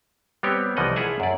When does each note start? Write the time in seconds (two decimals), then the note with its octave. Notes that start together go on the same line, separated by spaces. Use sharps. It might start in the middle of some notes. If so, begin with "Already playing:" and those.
0.43 G3 B3 C4 G4 C#5
0.77 C2 E3 F3 A3 D#5 F#5
0.96 E4 F4 G#4 E5 F#5 G#5
1.20 F#2 D5